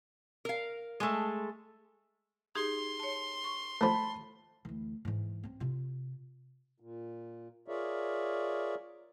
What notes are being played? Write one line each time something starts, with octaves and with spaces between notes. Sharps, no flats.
A#4 F5
G#3 A3
D#4 G4 G#4 C6
C#5 A5
C#6
F3 A3 A5 B5
D2 E3
G#2 E3
C4 C#4
C3 F4
A#2
F4 G#4 A#4 C#5 D5 E5